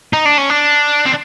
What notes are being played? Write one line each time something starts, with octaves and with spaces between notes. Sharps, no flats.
D#4
D4
C#4
D4
C4